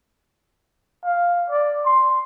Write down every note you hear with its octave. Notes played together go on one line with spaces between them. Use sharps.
F5
D5
C6